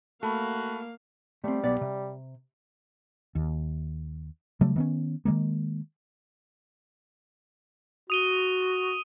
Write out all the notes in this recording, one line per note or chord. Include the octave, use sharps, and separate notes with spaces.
A3 A#3 F#4 F5 A5 B5
G3 A3 C4
B1 B3 D5
C3
D#2
C#3 F#3 G3 A3
D#3 B3 C#4
D#3 F#3 G#3 A#3
F#4 D#6 D#7 G7